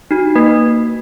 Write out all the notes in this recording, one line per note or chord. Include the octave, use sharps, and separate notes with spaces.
D#4 F#4
A#3 B4